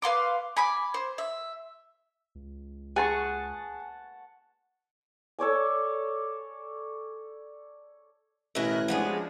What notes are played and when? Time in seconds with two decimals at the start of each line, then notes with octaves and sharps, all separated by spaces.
0.02 B4 F5 C6 D6
0.57 G#5 B5 D6
0.94 C5
1.18 E5
2.35 C#2
2.96 G#4 F#5 A5 C#6
5.39 A4 C#5 D5 G#5
8.55 A1 B2 E4 A#4 E5 G#5 F#6 A#6
8.88 F3 F#3 G#3 B3 D4 G#4